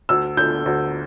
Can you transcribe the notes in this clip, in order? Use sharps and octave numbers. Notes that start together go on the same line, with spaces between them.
D2 E6
D3 G6
D2